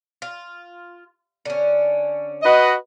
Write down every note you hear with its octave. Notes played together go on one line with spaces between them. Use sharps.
F4
D3 C#4
F#4 B4 D#5